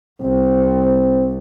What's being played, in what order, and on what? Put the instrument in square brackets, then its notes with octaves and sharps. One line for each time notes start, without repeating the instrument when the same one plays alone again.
[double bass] C2 [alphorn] C4